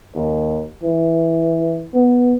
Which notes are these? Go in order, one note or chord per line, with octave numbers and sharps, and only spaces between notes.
D#2
E3
B3